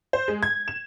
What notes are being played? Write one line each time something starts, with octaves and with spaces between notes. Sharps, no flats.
C5
G#3
G#6
E7